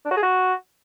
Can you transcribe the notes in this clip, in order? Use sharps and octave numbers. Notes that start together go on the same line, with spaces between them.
D4
F#4
G#4
F#4